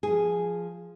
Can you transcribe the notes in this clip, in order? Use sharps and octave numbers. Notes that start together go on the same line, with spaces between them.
F3 G#4